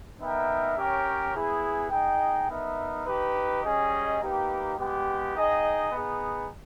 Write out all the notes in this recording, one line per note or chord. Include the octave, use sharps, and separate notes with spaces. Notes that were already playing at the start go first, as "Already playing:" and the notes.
B3 D#4 A#4 E5 G5
C#4 G4 A#4 C#5 G5
B3 E4 G#4
D#4 G#4 D#5 G5
B3 D#4 A#4 E5
D#4 G4 B4
G3 C#4 G#4 D#5
A#3 D#4 G4 B4
G#3 B3 G4
D#4 G#4 D#5 G5
B3 D#4 G#4